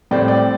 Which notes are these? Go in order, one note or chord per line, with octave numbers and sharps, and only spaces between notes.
A2 G3 C4 D5 G5
D5 G5